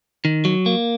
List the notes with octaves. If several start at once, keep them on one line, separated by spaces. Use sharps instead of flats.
D#3
F#3
A#3